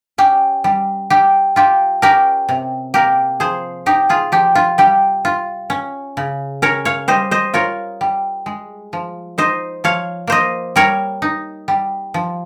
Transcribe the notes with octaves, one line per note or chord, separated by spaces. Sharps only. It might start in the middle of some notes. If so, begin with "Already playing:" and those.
C#4 G4
G3
G3 G4
F4 G4
C#4 G4 A#4
C3
A#3 G4 A#4
F3 G#4 C5
D#4 G4
F4 G#4
F3 G4
F4
G3 G4
F4
C#4
C#3
C#4 A#4 C#5
C#5 F5
G3 C5 D#5
C5 D#5
F4 A#4 C#5
G3
G#3
F3
D#4 C5 D#5
F3 C#5 F5
A#3 C5 D#5
G3 A#4 C#5
D#4
G3
F3